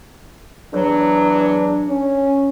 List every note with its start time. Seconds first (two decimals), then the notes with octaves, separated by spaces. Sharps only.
0.74 E2 F#3 D4
1.88 C#4